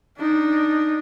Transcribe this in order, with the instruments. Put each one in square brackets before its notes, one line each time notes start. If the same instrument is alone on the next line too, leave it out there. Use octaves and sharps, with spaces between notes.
[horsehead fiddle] D4 D#4